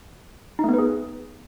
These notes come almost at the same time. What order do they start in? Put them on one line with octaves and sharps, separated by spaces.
D#4 A3 B3 B4 G#4